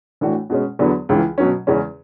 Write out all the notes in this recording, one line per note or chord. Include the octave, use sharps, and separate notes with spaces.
A2 E3 A3 D4 F#4
B2 G#3 C#4
E2 D3 F#3 B3
C#2 C#3 E3
B2 F#3 C#4
E2 C#3 G#3 C#4